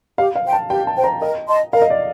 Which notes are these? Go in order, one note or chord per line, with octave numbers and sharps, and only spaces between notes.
G4 F5
F5
C5 G5
A5
G4 G5
A5
C5 G5
A#5
A#4 D#5
D#5 A5 C6
A#4 F5
D#5
D5